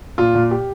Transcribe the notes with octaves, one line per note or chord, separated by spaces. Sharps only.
A#2 F4
A#2
G4